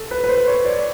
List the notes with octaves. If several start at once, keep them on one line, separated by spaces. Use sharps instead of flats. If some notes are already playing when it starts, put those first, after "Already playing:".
Already playing: A4
B4
B4
C5
C#5
D5